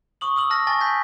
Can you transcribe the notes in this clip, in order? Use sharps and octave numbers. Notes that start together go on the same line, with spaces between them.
C#6 D#6 F#7
D#6 E6 F#7
A5 F6 A#6
G#5 A5 C#6 A6 A#6
G#5 G6 B6